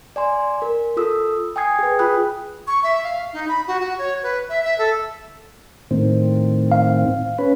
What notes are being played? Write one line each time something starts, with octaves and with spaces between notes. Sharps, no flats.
D5 G#5 C6
A#4
F4 A4 D#6 E6
G5 G#5 D#6 G#6 C7
G#4 B4
F4 G#4 G5 B5 D#6 F#6
C#6
E5
F5
D#4
B5
F#4
F#4
C#5
B4
E5
E5
A4
A2 D#3 C4
F5
C#4 B4